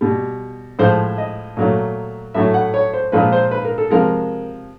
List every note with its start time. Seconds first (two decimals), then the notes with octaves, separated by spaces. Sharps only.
0.01 B2 G3
0.79 A2 F3 G#3 C5
1.18 D#5
1.57 A#2 F#3 A3
2.34 A2 F#3 A3 E5
2.54 F#5
2.74 C#5
2.93 C5
3.12 A#2 F3 G#3 B4
3.32 C5
3.51 B4
3.65 A#4
3.78 A4
3.91 C3 F3 G#3 A#4